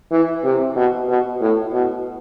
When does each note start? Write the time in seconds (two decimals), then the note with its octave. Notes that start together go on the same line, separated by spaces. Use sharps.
0.12 E3
0.44 C3
0.76 B2
1.08 B2
1.41 A2
1.73 B2